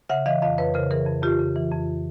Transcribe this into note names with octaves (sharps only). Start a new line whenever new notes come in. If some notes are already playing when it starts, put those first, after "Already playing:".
C#3 E5 F#5
E3 D#5 F5
F2 D#5 F5
F2 B4 C#5
C#3 A#4 C5
E3 G#4 A#4
F2
F2 F4 G4
C#3
E3
F2